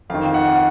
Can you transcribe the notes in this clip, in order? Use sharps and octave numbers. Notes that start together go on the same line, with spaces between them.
F2 D#3 F5
F#5